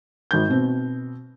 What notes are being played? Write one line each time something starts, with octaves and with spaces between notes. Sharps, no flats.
G#1 G6
B2 C4